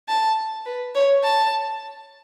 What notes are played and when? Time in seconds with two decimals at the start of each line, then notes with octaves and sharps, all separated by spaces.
0.08 A5
0.66 B4
0.95 C#5
1.23 A5